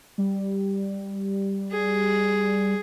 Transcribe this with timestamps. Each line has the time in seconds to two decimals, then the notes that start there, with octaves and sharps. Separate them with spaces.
0.18 G3
1.71 G#4